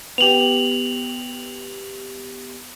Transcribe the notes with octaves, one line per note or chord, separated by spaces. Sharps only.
B3 G4 F7 F#7